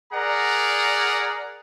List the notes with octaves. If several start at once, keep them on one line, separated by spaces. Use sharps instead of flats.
G#4 A#4 D5 F#5 A#5